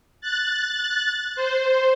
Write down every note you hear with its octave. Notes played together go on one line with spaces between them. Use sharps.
F#6 A6
C5